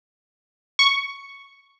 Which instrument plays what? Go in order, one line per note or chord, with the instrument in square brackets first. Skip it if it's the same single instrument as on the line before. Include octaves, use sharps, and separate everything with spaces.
[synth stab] C#6